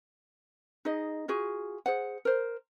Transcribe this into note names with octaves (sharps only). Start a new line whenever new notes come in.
D#4 G#4 D#5
F4 F#4 G#4
G#4 C5 F#5
A#4 C5